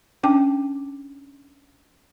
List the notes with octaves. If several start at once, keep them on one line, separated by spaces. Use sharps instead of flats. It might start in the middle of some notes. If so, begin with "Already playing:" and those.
C#4 D4 G5 D6